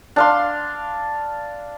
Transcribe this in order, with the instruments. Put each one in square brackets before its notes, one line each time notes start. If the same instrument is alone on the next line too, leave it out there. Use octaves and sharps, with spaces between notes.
[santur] D4 F5 C6